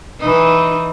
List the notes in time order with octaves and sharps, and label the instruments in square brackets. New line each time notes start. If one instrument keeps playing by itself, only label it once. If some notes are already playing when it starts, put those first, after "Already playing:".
[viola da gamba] E3 D#4